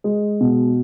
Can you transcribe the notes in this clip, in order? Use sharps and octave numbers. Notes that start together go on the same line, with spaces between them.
G#3
B2